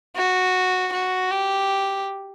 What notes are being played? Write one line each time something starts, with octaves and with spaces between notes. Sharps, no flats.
F#4
F#4
G4